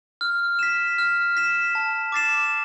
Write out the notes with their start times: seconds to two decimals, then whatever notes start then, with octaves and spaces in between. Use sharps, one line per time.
0.21 F6
0.59 B6 E7
0.98 F6
1.37 B6 E7
1.75 A5
2.12 D6 A6 C7 E7